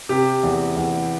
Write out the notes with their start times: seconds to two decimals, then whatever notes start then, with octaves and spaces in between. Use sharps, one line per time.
0.09 C3 G4
0.43 E2
0.77 E2